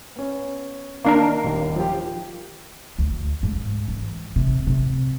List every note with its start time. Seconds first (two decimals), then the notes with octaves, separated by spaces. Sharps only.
0.16 B3 C#4
1.05 D#3 A#3 D4 A#4 C7
1.44 D#1 D#2 D#3
1.76 F3 F4 G4
2.99 D2
3.43 G#2
3.88 E3
4.36 C3
4.67 C3